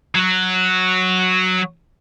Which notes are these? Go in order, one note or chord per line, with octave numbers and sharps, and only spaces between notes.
F#3 F#4